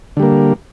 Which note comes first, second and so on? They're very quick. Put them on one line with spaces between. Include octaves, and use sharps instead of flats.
D3 G3 A#3